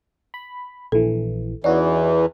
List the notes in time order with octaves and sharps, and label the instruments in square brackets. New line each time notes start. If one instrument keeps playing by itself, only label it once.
[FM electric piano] B5
[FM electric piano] A#1 E3 [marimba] A4
[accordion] E2 E3 [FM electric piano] C#4 D#4 F#4 [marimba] D5